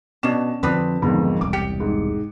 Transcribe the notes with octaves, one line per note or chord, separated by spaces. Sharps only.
B2 C#4 D4 E7
F2 D3 F3 C4 D4 B4 D#6
B1 F2 G#2 D3 D#3 B3
E1 C2 D6
G4 C#7
G#2